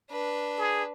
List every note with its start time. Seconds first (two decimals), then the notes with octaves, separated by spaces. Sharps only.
0.11 D4 B4
0.58 G#4